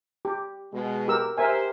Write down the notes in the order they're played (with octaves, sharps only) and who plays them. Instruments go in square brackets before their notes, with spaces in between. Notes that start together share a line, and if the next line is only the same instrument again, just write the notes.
[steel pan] G4
[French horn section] B2 G#3
[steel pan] G4 A#4 E6
[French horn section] G4 C5 [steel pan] A#4 E5 G#5